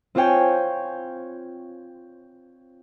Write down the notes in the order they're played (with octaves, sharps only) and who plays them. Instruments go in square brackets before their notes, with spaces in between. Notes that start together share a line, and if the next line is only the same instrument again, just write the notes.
[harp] C4 F4 C5 C#5 G5 G#5